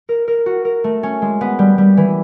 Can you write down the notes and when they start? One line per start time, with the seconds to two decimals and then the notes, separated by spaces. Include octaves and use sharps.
0.09 A#4
0.28 A#4
0.46 F#4
0.65 A#4
0.84 A3
1.03 C#4
1.22 G#3
1.41 B3
1.59 G3
1.78 G3
1.97 E3